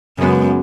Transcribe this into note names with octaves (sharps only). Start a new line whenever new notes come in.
F#2 C#3 G#3 B3